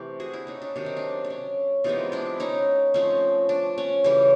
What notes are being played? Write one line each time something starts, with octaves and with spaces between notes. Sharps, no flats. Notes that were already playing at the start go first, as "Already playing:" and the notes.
Already playing: C3 E3 A3 G4
F#4 G#4
D4 E4
C#4 D#4
D4
C3 D#3 F#3 D4
D#4
D4
D4
C#4
C3 E3 G#3 B3 D#4 F4
D4 E4
C#4 D#4
F3 A3 C4 C#4
D4
C#4
C#3 E3 G3 C#4